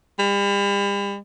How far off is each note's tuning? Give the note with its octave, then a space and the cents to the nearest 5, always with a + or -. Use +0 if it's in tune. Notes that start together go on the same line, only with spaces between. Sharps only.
G3 +40